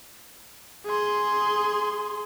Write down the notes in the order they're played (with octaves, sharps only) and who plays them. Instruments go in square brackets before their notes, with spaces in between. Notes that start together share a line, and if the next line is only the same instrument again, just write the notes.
[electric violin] G#4 C6